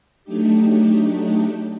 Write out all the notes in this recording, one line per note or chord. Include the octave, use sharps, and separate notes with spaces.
F#3 A3 D4 D#4 G4